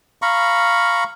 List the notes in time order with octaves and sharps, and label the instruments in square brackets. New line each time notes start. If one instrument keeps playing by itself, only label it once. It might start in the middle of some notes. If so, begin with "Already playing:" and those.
[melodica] F5 A#5 B5 C#6